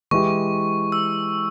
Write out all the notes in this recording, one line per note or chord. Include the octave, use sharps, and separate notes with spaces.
E3 G#3 E4 G4 C#6
E6